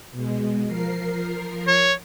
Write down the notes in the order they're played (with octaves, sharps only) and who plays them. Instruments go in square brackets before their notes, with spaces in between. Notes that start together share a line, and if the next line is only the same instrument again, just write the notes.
[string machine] B2 G#3
F3 A#4 C7
[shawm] C#5